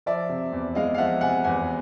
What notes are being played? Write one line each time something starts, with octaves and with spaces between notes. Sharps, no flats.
F3 D5 E5
C3
E2
G#3 D#5 F5
F5
F3 E5 F#5
C3 F#5 G#5
E2 F#5 G#5